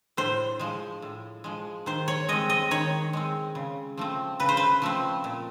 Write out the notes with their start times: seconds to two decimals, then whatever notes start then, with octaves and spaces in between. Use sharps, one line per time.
0.17 A2 C5
0.60 F3 G#3
1.02 A2
1.44 F3 G#3
1.86 D#3 C5
2.08 C#5
2.29 G#3 C4 D#5
2.50 D#5
2.71 D#3 C#5
3.13 G#3 C4
3.55 C#3
3.98 F3 A3 C4
4.40 C#3 B4
4.49 C5
4.57 B4
4.82 F3 A3 C4
5.24 A#2